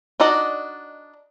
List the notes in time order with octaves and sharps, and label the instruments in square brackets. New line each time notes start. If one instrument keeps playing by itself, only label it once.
[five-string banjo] D4 D#4 F#4 D5 D#5